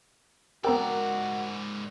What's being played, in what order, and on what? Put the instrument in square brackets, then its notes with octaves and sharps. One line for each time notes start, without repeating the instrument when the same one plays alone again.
[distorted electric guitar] G#2 D5 [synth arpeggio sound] B3 C4 G5 [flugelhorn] F#4 [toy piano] A#4 A#5